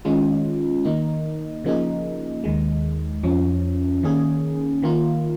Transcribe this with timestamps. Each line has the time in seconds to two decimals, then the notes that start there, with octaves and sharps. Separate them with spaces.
0.05 D#3 G#3 C#4 F4
0.85 D#3 A#3 D#4
1.64 C#3 F3 A#3 D#4 G#4
2.44 D#2 D#3 G#3
3.23 F2 F3 C#4
4.03 D#3 A#3 C#4 G#4
4.82 D#3 A#3 F4